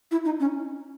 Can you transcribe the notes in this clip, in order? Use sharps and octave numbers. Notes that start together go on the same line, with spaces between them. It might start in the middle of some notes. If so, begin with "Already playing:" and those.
E4
D#4
C#4